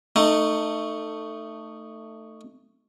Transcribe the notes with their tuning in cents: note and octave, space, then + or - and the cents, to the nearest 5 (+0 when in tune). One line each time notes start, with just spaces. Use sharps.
A3 +15 D#4 -10